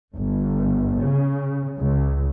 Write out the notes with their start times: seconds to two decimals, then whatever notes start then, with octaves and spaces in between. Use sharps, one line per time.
0.16 G1
1.02 C#3
1.81 C#2